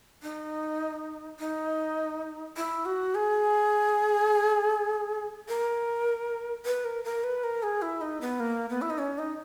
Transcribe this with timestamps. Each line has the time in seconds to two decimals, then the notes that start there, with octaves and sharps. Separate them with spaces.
0.23 D#4
1.40 D#4
2.57 E4
2.85 F#4
3.15 G#4
5.48 A#4
6.65 B4
6.85 A#4
7.04 A#4
7.24 B4
7.44 A#4
7.63 G#4
7.82 E4
8.01 D#4
8.21 B3
8.40 A#3
8.70 B3
8.82 E4
8.90 D#4
8.98 C#4
9.18 D#4